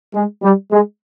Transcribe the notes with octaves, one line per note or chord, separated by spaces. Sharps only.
G#3
G3
G#3